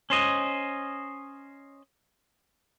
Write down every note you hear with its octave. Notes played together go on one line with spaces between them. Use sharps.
C#4 C5 D#5